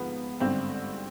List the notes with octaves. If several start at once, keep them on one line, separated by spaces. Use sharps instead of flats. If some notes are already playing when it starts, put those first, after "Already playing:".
Already playing: G#2 F3 B3
G#1 G2 D3 C4